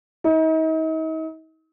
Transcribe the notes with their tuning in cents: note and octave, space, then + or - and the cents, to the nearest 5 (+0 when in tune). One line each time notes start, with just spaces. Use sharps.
D#4 +40